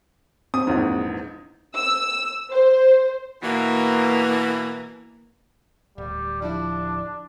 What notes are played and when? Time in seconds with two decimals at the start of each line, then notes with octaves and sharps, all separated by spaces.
0.54 C4 D#6
0.67 A#1 E2 G#2
1.76 E6
2.51 C5
3.43 B2 E3 A#3
5.98 D1 G3
6.42 F3 G3 D4 E4